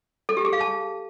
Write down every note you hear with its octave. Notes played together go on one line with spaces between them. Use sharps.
A4
G4
G#4
F5
A5